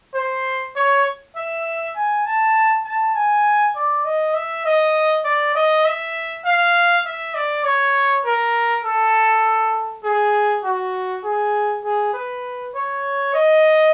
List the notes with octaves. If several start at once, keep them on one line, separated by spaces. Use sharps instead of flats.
C5
C#5
E5
G#5
A5
A5
G#5
D5
D#5
E5
D#5
D5
D#5
E5
F5
E5
D5
C#5
A#4
A4
G#4
F#4
G#4
G#4
B4
C#5
D#5